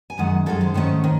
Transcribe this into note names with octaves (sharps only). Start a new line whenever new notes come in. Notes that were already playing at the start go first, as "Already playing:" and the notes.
G#5
F#2 D#3 G#3 F#5
F#2 D#3 G#3 A4
C5
G#2 D#3 A3 C#4
D#3